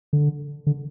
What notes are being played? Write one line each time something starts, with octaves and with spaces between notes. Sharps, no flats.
D3
D3